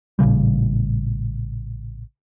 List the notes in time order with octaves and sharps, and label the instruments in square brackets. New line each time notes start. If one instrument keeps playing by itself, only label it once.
[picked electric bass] A1 A#2 C#3 G3